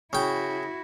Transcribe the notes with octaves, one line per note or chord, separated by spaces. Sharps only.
C#3 E4 F#4 G5